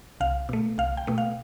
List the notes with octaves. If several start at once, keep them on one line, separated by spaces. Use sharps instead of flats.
C2 F5
B2 A3
C2 F5
G5
B2 A3
F5